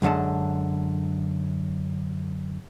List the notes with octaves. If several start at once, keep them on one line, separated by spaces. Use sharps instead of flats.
B1 F#2 D3 G#3 A5